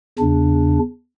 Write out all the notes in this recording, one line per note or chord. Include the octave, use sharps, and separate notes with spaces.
E2 C#3 D4